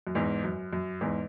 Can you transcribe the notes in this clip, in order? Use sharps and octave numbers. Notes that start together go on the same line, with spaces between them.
F#2
E2 G#2
F#2
F#2
E2 G#2